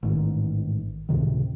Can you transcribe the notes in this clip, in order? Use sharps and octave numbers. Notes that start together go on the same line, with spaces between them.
A1 G#2 D#3
C#2 A2 C3 D#3